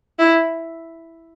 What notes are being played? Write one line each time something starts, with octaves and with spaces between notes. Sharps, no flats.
E4